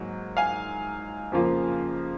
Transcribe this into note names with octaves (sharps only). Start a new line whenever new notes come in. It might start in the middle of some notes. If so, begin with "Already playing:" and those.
Already playing: G#2 F#3 A#3
F5 G#5
F2 C#3 F3 A#3 F4